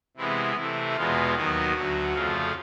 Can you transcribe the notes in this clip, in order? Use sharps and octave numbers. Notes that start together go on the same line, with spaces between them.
C3 E3 G#3 B3 E4
C3 E3 A3 E4
E2 B2 G#3 B3 F4
D#2 D#3 F#3 B3 F#4
D2 D3 F#3
F2 C#3 F3 A3 F4